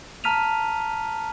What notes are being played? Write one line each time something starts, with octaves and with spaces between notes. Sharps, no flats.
A5 A#5 F6 B6 D#7 F7